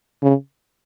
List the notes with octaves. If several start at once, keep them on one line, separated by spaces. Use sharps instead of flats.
C#3